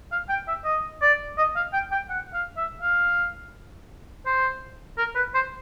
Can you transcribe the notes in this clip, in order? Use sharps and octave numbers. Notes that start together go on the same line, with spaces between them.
F5
G5
E5
D#5
D5
D#5
F5
G5
G5
F#5
F5
E5
F5
C5
A#4
B4
C5